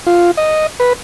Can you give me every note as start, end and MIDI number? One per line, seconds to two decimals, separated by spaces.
0.07 0.31 65
0.37 0.67 75
0.80 0.93 71